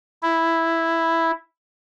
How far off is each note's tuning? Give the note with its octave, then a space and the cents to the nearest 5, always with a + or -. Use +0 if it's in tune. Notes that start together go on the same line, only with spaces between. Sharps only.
E4 +0